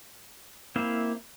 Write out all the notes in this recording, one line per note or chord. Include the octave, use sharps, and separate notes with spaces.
A#3 C4 E4 E5 F5